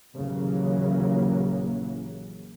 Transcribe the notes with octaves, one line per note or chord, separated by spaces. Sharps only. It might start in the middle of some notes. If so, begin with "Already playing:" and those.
A#1 D#2 C#3 E3 F#3 A#3